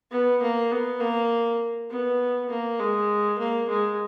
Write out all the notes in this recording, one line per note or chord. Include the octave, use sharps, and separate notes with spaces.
B3
A#3
B3
A#3
B3
A#3
G#3
A#3
G#3